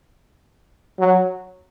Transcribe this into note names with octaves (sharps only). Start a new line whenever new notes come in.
F#3